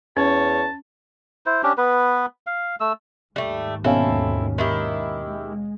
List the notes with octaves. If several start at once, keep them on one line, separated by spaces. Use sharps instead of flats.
E2 C#4 C#5 A5
E4 C5
C#4 D4 G4
B3 B4
F5
A3 E6
D#2 G#2 G3 A3
B2 C4 C#4 E4 A4 F5
D#3 E4 G4
G#3